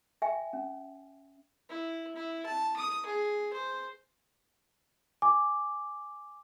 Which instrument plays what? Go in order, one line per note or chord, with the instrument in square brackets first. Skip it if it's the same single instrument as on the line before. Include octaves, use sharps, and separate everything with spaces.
[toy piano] E5 G5 G#5
C#4
[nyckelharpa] E4
E4
A5
D#6
G#4
C5
[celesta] G#5 D6